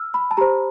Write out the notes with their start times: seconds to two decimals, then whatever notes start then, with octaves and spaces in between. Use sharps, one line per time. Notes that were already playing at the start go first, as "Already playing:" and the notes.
Already playing: E6 F6
0.14 B5
0.31 A5
0.37 G4 C5 A#5